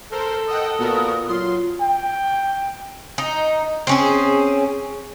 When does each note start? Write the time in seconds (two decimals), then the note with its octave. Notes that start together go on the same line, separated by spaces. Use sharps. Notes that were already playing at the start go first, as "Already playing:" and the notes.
0.12 A4 A#4 C5
0.48 D#5 F#5 G5 D#6
0.79 A#2 B3 F#4 A#4
1.28 F#3 F4 C6
1.81 G5
3.18 D#4
3.87 C4 C#4 G#4